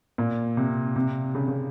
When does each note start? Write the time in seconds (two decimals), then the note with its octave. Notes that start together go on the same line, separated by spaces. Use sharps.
0.18 A#2
0.57 C3
0.96 C3
1.35 C#3
1.48 C#3